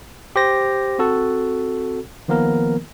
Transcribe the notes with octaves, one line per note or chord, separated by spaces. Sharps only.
G4 C5 A#6
C4 F#4 A4
D#3 F3 A#3 B3 A#4